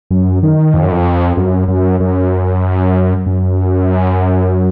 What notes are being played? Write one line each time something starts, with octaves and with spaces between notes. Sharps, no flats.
F#2
D#3
F2
F#2
F2
F#2
F#2
F#2
F#2